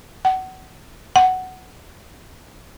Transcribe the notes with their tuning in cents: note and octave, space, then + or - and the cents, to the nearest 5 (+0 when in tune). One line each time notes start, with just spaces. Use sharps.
F#5 +25
F#5 +5